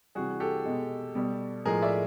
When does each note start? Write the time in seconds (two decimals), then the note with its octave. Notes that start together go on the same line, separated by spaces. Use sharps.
0.15 C3 E3 G3 F#4 G#4
0.40 G4 A4
0.65 B2 G#3
1.15 B2 G3
1.65 A2 F3 G#3 G#4 A#4
1.82 D5 E5